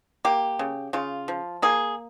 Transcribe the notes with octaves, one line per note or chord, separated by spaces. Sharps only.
A#3 G4
C#3
C#3 F4
F3
A#3 G#4